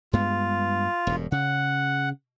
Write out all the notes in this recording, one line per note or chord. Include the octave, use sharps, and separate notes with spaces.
G2 G#3 B3 F4
E1 G2
C#3 F#5